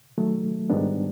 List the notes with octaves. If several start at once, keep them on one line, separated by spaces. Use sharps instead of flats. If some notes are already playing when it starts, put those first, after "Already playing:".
D#3 F#3 A3
G#2 D#3 G3 B3 D4